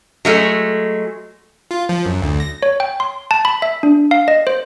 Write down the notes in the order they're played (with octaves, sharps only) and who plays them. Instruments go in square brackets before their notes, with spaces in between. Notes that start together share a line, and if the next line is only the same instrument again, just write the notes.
[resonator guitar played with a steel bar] F#3 G#3 A3
[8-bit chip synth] F4
F3
F#2
D2
A#6
[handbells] C#5
G5
C6
A5
B5
E5
D4
F5
D#5
C5